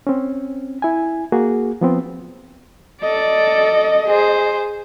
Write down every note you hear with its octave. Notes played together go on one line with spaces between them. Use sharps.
C4 C#4
E4 G#5
A#3 F#4 G#4
F3 B3 C4
A4 D5 D#5
G#4 C5